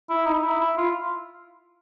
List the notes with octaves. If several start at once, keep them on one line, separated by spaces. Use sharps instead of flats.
E4
D#4
E4
E4
F4